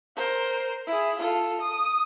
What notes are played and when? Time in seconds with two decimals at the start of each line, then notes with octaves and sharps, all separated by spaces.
0.17 A#4 C5
0.87 E4 G#4
1.19 F4 A4
1.61 D#6